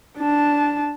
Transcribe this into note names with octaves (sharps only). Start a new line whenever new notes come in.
D4 A5